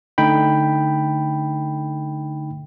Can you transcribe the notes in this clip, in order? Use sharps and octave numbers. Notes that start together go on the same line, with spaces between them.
D3 A3 D#4 G5 B5